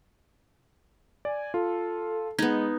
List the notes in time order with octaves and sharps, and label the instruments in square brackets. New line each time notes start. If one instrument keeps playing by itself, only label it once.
[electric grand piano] D5 [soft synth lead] G#5
[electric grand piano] F4 [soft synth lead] A4
[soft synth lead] G#3 [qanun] B3 D#4 [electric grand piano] G#6